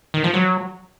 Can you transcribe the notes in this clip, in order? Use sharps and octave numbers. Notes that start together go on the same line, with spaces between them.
D#3
F3
F#3